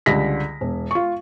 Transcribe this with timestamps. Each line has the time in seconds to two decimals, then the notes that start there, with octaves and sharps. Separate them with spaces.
0.06 C#2 D3 G3 A#6 B6
0.61 E1
0.91 F4 C#6